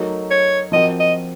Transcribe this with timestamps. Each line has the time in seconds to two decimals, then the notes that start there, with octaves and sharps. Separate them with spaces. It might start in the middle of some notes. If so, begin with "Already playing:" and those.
Already playing: F#3 A3 D#4 A#4
0.31 C#5
0.72 F3 C4 F#4 A#4 D#5
1.00 D#5